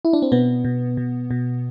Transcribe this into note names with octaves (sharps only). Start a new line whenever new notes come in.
E4
D4
C4
B2 B3
B2
B2
B2